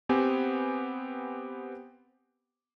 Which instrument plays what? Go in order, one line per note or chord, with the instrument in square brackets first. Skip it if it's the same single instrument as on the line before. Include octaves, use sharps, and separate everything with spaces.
[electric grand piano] B3 C4 G4 G#5